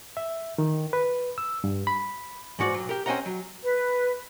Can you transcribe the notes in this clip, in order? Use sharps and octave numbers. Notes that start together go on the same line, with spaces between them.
E5
D#3
B4
E6
G2
B5
E2 G#2 F#4 D5
B1 F#3
G4 A#4
C4 C#4 F#4 D#5 F#5 A#5
F#3
B4